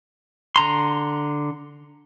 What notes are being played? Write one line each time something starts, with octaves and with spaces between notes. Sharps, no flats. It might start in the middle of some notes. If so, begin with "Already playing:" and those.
D3 A#5 C6